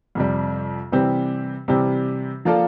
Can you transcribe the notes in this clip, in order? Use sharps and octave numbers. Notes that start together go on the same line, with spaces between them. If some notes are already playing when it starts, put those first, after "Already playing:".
F2 C3 G3
C3 E3 G3 C4 G4
C3 E3 G3 C4 G4
F3 A#3 F4 A4 D5